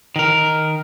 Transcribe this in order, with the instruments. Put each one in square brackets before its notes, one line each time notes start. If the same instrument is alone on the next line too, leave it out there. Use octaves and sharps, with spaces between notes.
[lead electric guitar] D#3 A#4